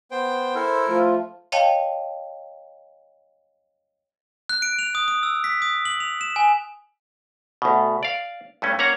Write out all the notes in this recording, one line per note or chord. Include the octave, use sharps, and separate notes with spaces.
B3 C5 G5
E4 A4 A#4 C5
F3 A3 F4
C#5 D#5 F5 G5 A5
F#6
D7
F7
D#6
D#6
E6
B6
D#6
F#7
F7
E7
G#5
D2 B2
D5 F5
G2 A3 C#4
A#3 C#4 C#5 F#5 A#5